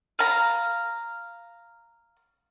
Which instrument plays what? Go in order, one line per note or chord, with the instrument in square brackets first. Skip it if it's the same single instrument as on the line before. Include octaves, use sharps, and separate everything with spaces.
[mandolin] F5 A#5